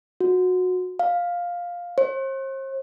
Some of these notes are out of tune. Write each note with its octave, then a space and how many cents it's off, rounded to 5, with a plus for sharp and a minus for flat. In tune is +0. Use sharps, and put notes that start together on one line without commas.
F#4 -20
F5 +5
C5 +45